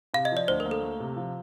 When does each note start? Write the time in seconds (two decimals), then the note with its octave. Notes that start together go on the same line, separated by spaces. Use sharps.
0.14 C3 F5
0.25 D#5
0.32 F3 D5
0.48 D2 C5
0.60 A#4
0.66 A#3
0.71 A4
0.82 A3
1.00 C3
1.16 F3